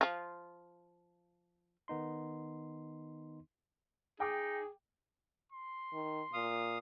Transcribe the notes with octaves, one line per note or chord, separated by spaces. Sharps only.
F3 F4
D#3 B3 D#4 C6
D#4 G#4 G5 D6
C6
D#3
A#2 F5 D#6